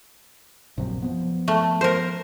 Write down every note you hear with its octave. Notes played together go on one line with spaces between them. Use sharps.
A#1 F#2 C3
F3 B3
A3
A#4 C5